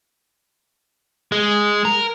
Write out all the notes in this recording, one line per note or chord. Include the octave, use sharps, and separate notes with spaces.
G#3
A#4